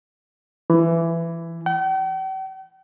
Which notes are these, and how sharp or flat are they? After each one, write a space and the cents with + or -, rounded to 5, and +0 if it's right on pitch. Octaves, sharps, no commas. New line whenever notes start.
E3 +15
G5 -45